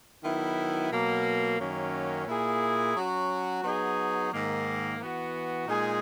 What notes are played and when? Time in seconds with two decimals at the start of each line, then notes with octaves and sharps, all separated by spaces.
0.24 D#3 F#3 B3 E4
0.92 B2 F#3 A#3
1.59 F#2 D#3 F#3 A#3 C#4
2.28 A#2 A#3 E4 G#4
2.96 F#3 C#4 F#4
3.63 F#3 B3 D#4 G#4
4.32 G#2 D#3 A#3
5.00 E3 B3 F#4
5.67 A#2 G#3 D#4 G#4